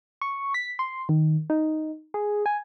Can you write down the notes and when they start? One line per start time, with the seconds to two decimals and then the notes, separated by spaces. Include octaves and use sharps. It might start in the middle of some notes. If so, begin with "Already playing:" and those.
0.22 C#6
0.54 B6
0.79 C6
1.09 D#3
1.50 D#4
2.14 G#4
2.46 G#5